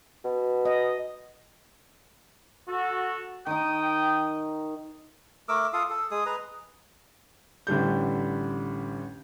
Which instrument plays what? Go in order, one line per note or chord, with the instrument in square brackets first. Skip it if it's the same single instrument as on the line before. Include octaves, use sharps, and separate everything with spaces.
[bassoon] B2
[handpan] D#5
[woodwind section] F#4 A4
[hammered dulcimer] D#3 D#4 [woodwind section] G5 D#6
[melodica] A3 A#4 D6 E6
F4 A4 F5 D#6
A4
G#3 G#4 D#6
G#4 B4 D#5 A#5
[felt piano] A1 D3 G3 G6